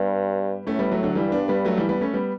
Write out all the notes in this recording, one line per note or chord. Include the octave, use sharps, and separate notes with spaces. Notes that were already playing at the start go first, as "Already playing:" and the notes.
Already playing: G2 G3 B3
A2 A3 C#4
G3 B3
F#3 A3
D3 F#3
G2 E3 G3
B3 D4
G3 B3
F#3 A3
E3 G3
G3 B3
A3 C#4
G3 B3